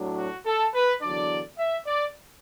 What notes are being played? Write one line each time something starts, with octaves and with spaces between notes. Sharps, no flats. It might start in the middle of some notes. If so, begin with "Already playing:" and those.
Already playing: A2 F#3 D4
F#4
A4
B4
E2 D3 F#3 D4 D5
E5
D5